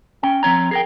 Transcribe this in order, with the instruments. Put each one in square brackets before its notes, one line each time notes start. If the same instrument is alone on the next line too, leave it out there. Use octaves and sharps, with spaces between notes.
[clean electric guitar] C#4 G5
F3 C4 C#5 A#5
G#4 A#4 G5